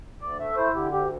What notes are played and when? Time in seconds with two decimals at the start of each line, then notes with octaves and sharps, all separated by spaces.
0.21 D2 D5
0.39 A3 E5
0.56 E4 C5
0.75 D3 G4
0.92 D2 G4